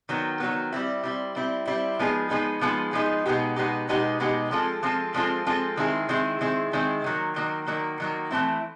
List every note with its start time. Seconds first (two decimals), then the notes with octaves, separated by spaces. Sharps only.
0.09 D#3 F#3 B3
0.40 D#3 F#3 B3
0.72 G3 C4 E4
1.03 G3 C4 E4
1.36 G3 C4 E4
1.67 G3 C4 E4
1.99 F3 G#3 B3 D#4 G#4
2.30 F3 G#3 B3 D#4 G#4
2.61 F3 G#3 B3 D#4 G#4
2.93 F3 G#3 B3 D#4 G#4
3.26 B2 G#3 B3 D#4 G4
3.56 B2 G#3 B3 D#4 G4
3.89 B2 G#3 B3 D#4 G4
4.20 B2 G#3 B3 D#4 G4
4.51 F3 G#3 C4 F4 A4
4.83 F3 G#3 C4 F4 A4
5.15 F3 G#3 C4 F4 A4
5.46 F3 G#3 C4 F4 A4
5.77 D#3 G#3 C4 E4 G#4
6.09 D#3 G#3 C4 E4 G#4
6.41 D#3 G#3 C4 E4 G#4
6.73 D#3 G#3 C4 E4 G#4
7.04 D#3 F#3 A#3
7.36 D#3 F#3 A#3
7.67 D#3 F#3 A#3
8.00 D#3 F#3 A#3
8.31 E3 A3 C4 E4